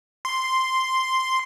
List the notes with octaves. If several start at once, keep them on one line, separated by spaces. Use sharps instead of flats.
C6